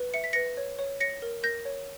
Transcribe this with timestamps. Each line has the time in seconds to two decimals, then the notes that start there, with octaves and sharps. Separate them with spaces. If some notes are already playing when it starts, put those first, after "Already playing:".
Already playing: B4
0.14 E5 C#7
0.24 B6
0.33 B4 A#6 C#7
0.57 C#5
0.79 C#5
1.00 C#5 A#6 C#7
1.22 A#4
1.43 A#4 G6 A#6
1.65 C#5